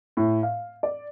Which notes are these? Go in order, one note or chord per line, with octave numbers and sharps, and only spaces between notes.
A2
F5
D5